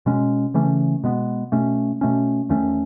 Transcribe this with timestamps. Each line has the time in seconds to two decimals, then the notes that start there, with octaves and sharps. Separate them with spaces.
0.06 B2 G#3 C#4
0.54 C#3 E3 A3 C#4
1.04 B2 G#3 B3
1.52 B2 A3 C#4
2.01 B2 A3 C#4
2.49 E2 D#3 A3 C#4